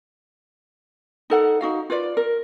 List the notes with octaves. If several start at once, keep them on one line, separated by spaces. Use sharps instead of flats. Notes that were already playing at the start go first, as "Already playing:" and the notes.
D#4 A4 F#5
D#4 F#4 F5
F4 B4 D5
A#4